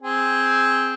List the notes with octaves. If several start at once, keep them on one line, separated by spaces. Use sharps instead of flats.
C4 G#4